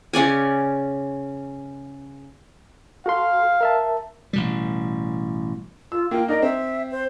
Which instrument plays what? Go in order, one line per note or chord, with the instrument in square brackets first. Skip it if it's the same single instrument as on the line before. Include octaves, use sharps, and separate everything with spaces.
[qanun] C#3 C#4 D5 G#5
[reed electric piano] F#4 A4 C6 [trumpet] F5
[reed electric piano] A#4 E5 A5
[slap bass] A1 B2 G3
[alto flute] F4 [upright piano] E6
[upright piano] A#3 F4 [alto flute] G5
[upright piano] D#4 A#4 D5 [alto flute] D#5
[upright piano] C4 [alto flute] E5
[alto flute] C5